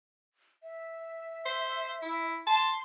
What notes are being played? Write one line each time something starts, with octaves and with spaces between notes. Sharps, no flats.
E5
C5
E4
A5 C6